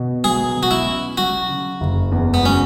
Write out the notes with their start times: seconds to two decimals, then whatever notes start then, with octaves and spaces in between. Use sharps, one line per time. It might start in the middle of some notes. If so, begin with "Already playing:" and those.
Already playing: B2
0.24 F#3 G#4
0.56 B2
0.63 F#4
0.71 E4
0.87 C#4
1.18 F#3 F#4
1.49 C#3
1.81 F#1
2.12 E2
2.34 B3
2.43 F#3 C#4